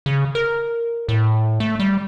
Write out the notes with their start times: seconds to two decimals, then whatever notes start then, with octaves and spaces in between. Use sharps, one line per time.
0.06 C#3
0.35 A#4
1.09 A2
1.60 A3
1.80 G3